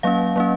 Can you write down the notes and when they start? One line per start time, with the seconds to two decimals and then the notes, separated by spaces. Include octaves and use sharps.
0.03 F#3 A#3 C#4 F5
0.36 F#3 A#3 C#4